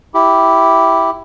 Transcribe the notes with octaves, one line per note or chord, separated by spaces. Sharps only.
E4 G4